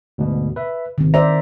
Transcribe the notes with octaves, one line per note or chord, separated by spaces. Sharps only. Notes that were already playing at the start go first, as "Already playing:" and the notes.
D2 G#2 B2
B4 E5
G#1 C3 D#3 C4
C5 D5 E5 A#5